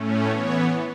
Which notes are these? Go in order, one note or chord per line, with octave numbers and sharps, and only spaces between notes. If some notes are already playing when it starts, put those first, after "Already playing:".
Already playing: A2 A3 C#4
E3 B3 C#5